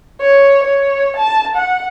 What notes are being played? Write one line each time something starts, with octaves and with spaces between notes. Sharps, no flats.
C#5
C#5
A5
F#5